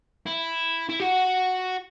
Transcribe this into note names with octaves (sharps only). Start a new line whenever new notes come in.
E4
E4
F#4